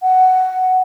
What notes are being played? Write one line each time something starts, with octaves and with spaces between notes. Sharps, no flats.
F#5